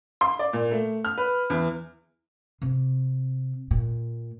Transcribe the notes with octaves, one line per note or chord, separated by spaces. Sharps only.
C6
D5
A#2
A3
F6
B4
E2
C3
A#2